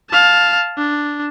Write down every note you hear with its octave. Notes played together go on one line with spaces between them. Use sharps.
F5 A5
D4